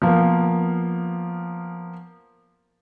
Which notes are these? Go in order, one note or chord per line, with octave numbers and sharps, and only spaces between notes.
F3 A#3 B3